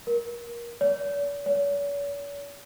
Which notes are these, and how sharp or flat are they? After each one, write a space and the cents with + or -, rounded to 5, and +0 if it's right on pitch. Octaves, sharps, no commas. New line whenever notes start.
A#4 +25
D5 -45
C#5 +45